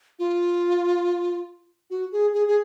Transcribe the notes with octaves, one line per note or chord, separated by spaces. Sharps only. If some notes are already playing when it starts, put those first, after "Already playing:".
F4
F#4
G#4
G#4
G#4